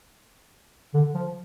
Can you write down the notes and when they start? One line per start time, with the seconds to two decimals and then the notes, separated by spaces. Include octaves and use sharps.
0.94 D3
1.15 F3